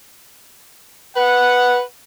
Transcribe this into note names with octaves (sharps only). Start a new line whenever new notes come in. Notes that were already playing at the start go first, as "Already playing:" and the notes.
B4 F#5